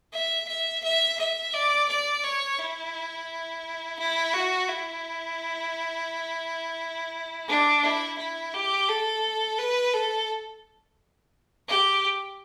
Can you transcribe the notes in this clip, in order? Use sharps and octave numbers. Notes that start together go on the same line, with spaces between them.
E5
E5
E5
E5
D5
D5
C#5
E4
E4
F#4
E4
D4
E4
E4
G4
A4
B4
A4
G4